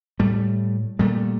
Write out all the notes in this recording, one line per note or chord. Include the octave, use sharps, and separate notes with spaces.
A2 G3 A3
A#2 G3 A3